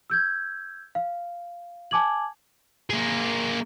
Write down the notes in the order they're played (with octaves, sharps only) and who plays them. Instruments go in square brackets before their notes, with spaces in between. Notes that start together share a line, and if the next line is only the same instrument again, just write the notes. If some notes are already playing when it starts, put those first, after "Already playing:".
[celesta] E6 G6 G#6
F5
G#5 A5 D6 G#6 F#7
[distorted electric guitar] A#3 G#4